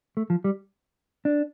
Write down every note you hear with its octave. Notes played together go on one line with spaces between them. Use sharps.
A3
F3
G3
D4